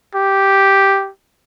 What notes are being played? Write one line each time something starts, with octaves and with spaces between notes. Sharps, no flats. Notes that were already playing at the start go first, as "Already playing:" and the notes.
G4